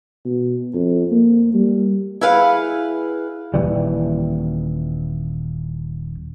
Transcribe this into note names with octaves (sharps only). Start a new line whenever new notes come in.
B2
F2
A#3
G3
E4 G#4 B4 F5 F#5
D#1 E3 G3